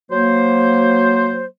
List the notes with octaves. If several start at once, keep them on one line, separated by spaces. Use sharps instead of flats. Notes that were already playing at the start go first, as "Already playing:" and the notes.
F#3 A#3 C5